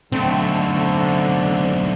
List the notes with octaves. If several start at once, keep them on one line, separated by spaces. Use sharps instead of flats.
B1 D3 A3 C4